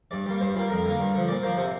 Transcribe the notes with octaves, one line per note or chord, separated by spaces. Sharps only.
G2 D5
G3 A#3
G2 C5
G3 A#3 F4
F2 A#4
D3 A#3
G2
D3 F3
A#2 D5
F3 A#3 C5
C3 C5